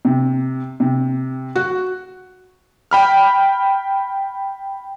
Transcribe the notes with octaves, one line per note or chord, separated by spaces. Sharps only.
C3
C3
F#4
G5 B5 F6